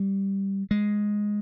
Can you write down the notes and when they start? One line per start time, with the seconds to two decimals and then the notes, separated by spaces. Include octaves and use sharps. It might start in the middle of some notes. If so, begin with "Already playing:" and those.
Already playing: G3
0.71 G#3